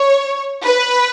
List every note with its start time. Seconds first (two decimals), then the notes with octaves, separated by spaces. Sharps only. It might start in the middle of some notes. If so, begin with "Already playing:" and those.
Already playing: C#5
0.64 B4